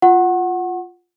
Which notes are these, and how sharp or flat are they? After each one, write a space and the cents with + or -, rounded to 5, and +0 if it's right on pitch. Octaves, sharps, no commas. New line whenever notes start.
F4 +0 F#5 +0 C#6 -40